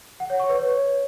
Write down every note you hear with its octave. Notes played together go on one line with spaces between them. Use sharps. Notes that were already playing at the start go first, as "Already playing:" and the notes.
F#5
C#5
C#6
B4
C#5